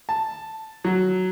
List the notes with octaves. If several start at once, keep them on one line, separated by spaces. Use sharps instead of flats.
A5
F#3